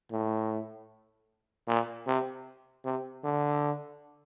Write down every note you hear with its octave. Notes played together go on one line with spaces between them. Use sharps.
A2
A#2
C3
C3
D3